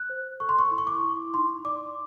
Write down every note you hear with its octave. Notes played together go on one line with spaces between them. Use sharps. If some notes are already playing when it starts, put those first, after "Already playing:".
Already playing: F#6
C5
A4 C#6
C6
C#6
E4
C#6
D6
E4
D#4 C6
D5 D6